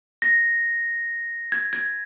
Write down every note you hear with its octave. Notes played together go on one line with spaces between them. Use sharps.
A#6
G#6
G#6